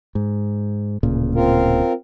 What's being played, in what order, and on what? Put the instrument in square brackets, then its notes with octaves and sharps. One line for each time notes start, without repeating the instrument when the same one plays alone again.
[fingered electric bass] G#2
D1 A#2 C#3
[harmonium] C4 F4 A#4